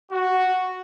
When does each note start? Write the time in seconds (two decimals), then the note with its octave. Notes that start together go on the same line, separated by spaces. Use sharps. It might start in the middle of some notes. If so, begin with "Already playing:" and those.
0.11 F#4